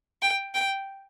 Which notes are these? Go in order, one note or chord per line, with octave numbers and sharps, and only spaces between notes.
G5
G5